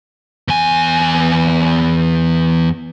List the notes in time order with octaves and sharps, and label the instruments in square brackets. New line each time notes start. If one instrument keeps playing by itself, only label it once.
[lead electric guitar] E2 G#5